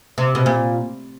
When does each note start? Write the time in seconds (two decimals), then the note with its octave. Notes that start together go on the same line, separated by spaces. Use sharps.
0.18 C3
0.35 B2
0.46 A#2